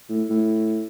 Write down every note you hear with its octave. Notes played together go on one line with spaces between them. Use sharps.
A2
A2